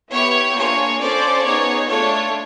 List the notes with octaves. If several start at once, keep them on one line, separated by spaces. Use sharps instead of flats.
B3 E4 G4 C#5
A#3 D4 F4 G#4 C#5
C#4 F4 A4 C5 D5
B3 D#4 G#4 C#5
A3 D4 F4 A4 C#5